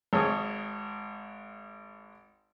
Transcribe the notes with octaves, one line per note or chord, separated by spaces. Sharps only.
G#1 G#3 C#5 D#6